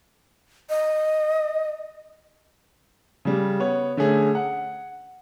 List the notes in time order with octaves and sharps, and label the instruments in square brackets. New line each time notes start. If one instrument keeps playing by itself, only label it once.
[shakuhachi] D#5
[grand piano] C#3 G3
B3 C#5
D3 A3 C#4 G#4
F#5